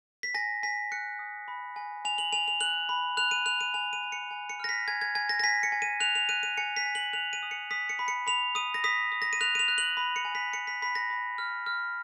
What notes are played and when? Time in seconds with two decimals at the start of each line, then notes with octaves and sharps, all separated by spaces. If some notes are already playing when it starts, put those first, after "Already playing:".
0.23 B6
0.34 G#5 A#6
0.63 G#5 B6
0.92 F#6 C#7
1.19 D#6
1.48 B5
1.76 G#5
2.05 G#5 F7
2.18 F#7
2.33 G#5 F7
2.48 F7
2.61 F#6 F#7
2.89 B5
3.17 F#6 F7
3.31 D#7
3.46 F#6 F7
3.61 D#7
3.74 G#5 F7
3.93 D#7
4.03 G#5
4.12 C#7
4.31 G#5
4.49 C#7
4.60 F6 A#6
4.69 B6
4.88 G#5 G#6
5.01 G#6
5.15 G#5 G#6
5.29 A#6
5.40 A#6
5.44 G#5 B6
5.63 C#7
5.72 G#5
5.82 D#7
6.00 F#6 F7
6.15 F7
6.29 F#6 D#7
6.43 D#7
6.57 G#5 C#7
6.77 B6
6.86 G#5
6.95 F#7
7.13 F#6 F7
7.33 D#7
7.43 D#6
7.51 C#7
7.71 D#6 B6
7.89 C#7
7.99 B5
8.08 C#7
8.27 B5 F7
8.55 D#6 D#7
8.74 A#6
8.84 D#6 B6
9.12 D#6
9.22 A#6
9.33 D#7
9.41 F#6 F7
9.55 D#7
9.59 F7
9.68 F#6
9.78 F#7
9.97 B5
10.16 C#7
10.25 G#5
10.35 B6
10.53 B5 C#7
10.67 B6
10.82 B5 B6
10.95 A#6
11.10 B5
11.38 F6
11.66 F6